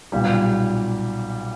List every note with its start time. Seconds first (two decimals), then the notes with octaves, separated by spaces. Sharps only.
0.12 B1 A#2 G3